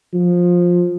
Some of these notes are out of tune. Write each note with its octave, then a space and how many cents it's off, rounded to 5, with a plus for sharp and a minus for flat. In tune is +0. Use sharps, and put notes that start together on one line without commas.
F3 +15